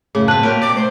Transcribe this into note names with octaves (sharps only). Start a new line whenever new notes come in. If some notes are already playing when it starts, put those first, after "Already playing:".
F#2 A2 C#3 G#4
B2 C4 B4 A5 F#6 F#7
A#2 A#3 F#4 G4 A#4 C#5
C3 D5 D6
A3 C5